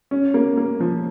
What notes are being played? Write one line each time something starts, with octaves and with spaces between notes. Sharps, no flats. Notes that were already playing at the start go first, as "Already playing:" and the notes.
C#4
A#3
A#3
F3